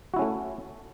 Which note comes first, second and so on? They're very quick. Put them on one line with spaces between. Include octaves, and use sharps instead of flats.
F#4 E4 C#4 A3